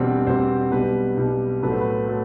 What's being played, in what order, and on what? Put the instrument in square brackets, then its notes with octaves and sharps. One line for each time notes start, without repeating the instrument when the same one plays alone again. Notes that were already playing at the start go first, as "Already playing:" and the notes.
Already playing: [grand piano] E1 E2 B2 G3 C4 D5
E1 E2 B2 G3 C4 C5
B1 B2 G3 B4
B1 B2 G3
B1 A2 F#3 A3 B4
C5
B4
F#3 A3